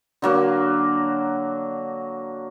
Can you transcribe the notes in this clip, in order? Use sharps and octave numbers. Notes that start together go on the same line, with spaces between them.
D3 F#3 A#3